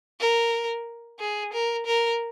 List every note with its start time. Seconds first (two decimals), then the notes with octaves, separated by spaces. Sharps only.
0.20 A#4
1.20 G#4
1.53 A#4
1.86 A#4